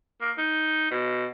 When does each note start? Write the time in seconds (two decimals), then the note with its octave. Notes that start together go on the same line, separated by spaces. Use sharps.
0.21 A#3
0.38 D#4
0.91 B2